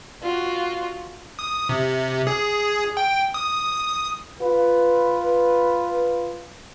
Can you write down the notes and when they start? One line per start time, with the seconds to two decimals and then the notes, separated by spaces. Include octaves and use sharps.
0.22 F4 F#4
1.39 D#6
1.69 C3
2.27 G#4
2.97 G5
3.34 D#6
4.40 F4 B4